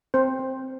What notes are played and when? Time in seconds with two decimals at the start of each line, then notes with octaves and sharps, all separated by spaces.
0.14 C4 C5
0.39 C4